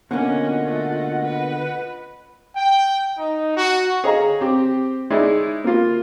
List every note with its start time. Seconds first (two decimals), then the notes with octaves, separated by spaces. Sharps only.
0.11 B2 D3 A#3 C#4 F4 D#5 F#5
0.66 A3
1.22 B4
2.56 G5
3.18 D#4
3.56 F#4
4.04 G#4 C#5 D#5 F5 A#5
4.41 C4 G4 C5
5.10 G#3 D#4 E4 C#5 D5
5.64 A#3 F4